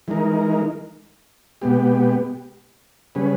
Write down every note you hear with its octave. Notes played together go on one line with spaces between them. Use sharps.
E3 G#3 D#4 A#4
B2 G#3 B3 G4
C#3 G3 C#4 G#4 B4